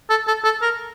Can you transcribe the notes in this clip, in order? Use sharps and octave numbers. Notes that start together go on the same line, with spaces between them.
A4
A4
A4
A#4